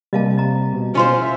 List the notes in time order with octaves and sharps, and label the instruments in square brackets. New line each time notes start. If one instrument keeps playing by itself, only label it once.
[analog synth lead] C3 [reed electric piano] G3 A#3 [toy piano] D#5 F5 A5
[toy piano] D#5 A#5
[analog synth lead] B2
[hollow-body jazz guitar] C#4 F4 C5 [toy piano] D#5 C6
[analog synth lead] E5